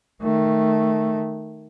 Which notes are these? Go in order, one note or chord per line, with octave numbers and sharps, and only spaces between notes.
D#3 A3